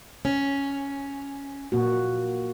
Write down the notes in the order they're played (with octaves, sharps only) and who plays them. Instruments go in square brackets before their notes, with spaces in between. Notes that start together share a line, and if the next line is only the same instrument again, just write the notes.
[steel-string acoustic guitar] C#4
[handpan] A#2 A#3 F#4